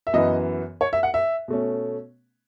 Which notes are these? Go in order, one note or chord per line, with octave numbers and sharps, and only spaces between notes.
E5
F#2 E3 B3 D#5
C#5
E5
F#5
E5
B2 A3 C#4